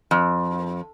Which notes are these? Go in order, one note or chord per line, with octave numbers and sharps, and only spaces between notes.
F2